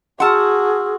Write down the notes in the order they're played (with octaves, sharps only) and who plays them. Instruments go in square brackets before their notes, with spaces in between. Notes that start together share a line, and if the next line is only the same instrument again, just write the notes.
[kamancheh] F#4 [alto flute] G#4 [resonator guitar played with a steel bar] F#5 A5 [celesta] C6 E6 F6